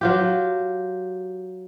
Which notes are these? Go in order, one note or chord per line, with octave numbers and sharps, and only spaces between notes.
F#3 F4 G4